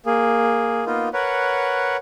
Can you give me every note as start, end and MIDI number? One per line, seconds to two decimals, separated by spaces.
0.06 0.85 58
0.06 0.85 68
0.86 1.09 58
0.86 1.09 59
0.86 1.09 63
0.86 1.09 65
1.13 1.97 70
1.13 1.97 71
1.13 1.97 73
1.13 1.97 78